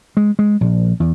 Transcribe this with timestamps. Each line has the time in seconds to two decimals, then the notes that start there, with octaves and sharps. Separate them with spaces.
0.17 G#3
0.39 G#3
0.61 A#1
1.00 E2